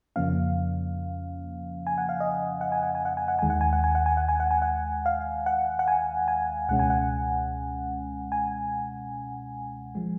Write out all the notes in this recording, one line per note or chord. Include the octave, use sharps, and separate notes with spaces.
F2 C#3 F3 A#3 C#4 F5
G#5
F#5
F5
D#5
F#5
G#5
F#5
G#5
F#5
G#5
F#5
D#2 D#3 G#3 G#5
F#5
G#5
F#5
G#5
F#5
G#5
F#5
G#5
F#5
G#5
F#5
F5
F#5
F#5
G#5
G#5
C#2 B2 G#3 C#4 F#5
G#5
F#5
G#5
F3 G#3